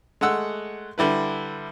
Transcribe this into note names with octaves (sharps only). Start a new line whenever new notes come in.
G#3 A3 F#5 E6
D3 G3 E4 B4